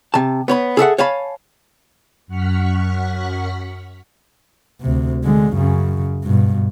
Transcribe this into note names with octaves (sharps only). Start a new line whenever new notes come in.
C3 A5
B3 C#5 B5
G#4 A4 E5 F#5
C#5 F5 G#5 A5 B5
F#2 F#5 C#6 F6 B6
D2 C3
D3 G#3
F#2 C#3
G2 B2